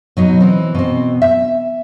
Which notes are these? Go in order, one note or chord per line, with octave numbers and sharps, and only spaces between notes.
B2 F#3 D#4
E3 C4
B2 C4
E5